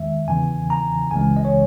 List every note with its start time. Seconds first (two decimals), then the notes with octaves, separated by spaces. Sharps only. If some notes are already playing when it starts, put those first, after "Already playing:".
Already playing: E2 D#3 G#3 E5
0.28 E2 C#3 E3 G#5
0.70 A#5
1.11 C#2 C#3 E3 G#3 G#5
1.36 D#5
1.45 C#5